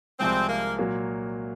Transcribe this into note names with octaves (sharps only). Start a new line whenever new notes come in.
C2 C3 F3 G#3 C4
A#3
A#2 F#3 A#3